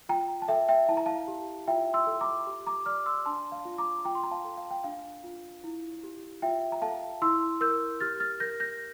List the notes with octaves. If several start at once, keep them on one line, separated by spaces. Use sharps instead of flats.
F4 G5 A#5
A5
A4 E5 G5
E5 G5
E4 A5
A#5
F5 A5
G4
F4 E5 G5
C6 E6
A4
A#5 D6
G4
A#5 D6
D5 D6 F6
C6 E6
D4 A5 C6
F5
F4
A#5 D6
F4 G5 A#5
C6
A#5
F5 A5
A4
F5
G5
D4 F5
F4
E4
G4
F4 E5 G5
A#5
A4 F5 A5
E4 C6 E6
A#4 E6 G6
G4 F6 A6
F6 A6
A#4 G6 A#6
G6 A#6